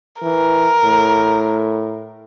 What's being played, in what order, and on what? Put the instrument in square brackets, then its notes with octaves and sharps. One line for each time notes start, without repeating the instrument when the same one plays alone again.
[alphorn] E3 [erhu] A#4
[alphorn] A2